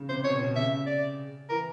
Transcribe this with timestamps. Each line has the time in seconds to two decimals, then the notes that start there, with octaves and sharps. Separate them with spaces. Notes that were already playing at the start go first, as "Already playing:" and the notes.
Already playing: C#3
0.09 C3 C5
0.24 B2 C#5
0.41 B2
0.56 C#3 E5
0.86 D5
1.49 E3 A#4